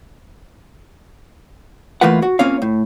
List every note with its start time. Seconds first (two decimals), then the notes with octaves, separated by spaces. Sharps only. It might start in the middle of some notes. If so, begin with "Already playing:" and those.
2.01 E3 A3 A#3 F4 B4 F#5
2.22 F#4
2.39 A#3 C4 C#4 F4 C#5 F5
2.62 A2